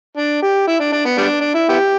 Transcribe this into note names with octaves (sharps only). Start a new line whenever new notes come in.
D4
G4
E4
D4
D4
B3
G3 B3 D4
D4
E4
B3 E4 G4